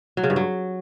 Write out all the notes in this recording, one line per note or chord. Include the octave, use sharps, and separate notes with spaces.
F#3
C#3
G2
F#3